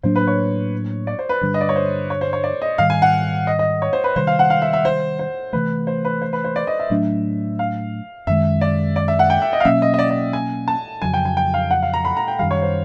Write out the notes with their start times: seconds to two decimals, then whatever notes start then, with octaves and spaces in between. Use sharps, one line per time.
0.03 A2 F#3 A#3 D4 C5
0.16 B4
0.27 C#5
1.07 D5
1.19 C5
1.29 B4
1.42 G2 D3 G3
1.54 D#5
1.61 D5
1.69 C#5
1.76 C5
2.10 C#5
2.21 C5
2.33 C#5
2.44 D5
2.62 D#5
2.78 G#2 D#3 G3 F5
2.90 G#5
3.02 F#5
3.47 D#5
3.59 D#5
3.82 C#5
3.93 C5
4.04 B4
4.16 C3 D#3 G3 C5
4.27 F5
4.39 F#5
4.50 F5
4.62 E5
4.73 E5
4.85 C5
5.19 C5
5.53 C3 E3 A3 B4
5.87 C5
6.05 B4
6.22 C5
6.33 B4
6.44 C5
6.56 D5
6.67 D#5
6.79 E5
6.90 A2 F#3 A3 D4
7.59 F5
8.27 F#2 D#3 G#3 E5
8.61 D5
8.96 D5
9.08 E5
9.19 F#5
9.30 G5
9.42 E5
9.53 D#5
9.60 F5
9.65 B2 F#3 A#3 C#4 E5
9.82 D#5
9.94 D#5
9.99 D5
10.10 D5
10.33 G#5
10.68 A5
11.02 F2 C#3 F#3 G#5
11.14 G5
11.25 G#5
11.37 G5
11.54 F5
11.71 F#5
11.82 F5
11.94 A#5
12.05 B5
12.17 A#5
12.28 G5
12.39 F#2 D#3 G3 F5
12.51 C#5
12.62 C5